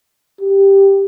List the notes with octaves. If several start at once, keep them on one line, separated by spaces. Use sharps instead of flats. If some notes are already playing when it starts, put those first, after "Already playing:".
G4